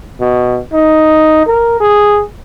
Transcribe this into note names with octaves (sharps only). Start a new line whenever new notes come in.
B2
D#4
A#4
G#4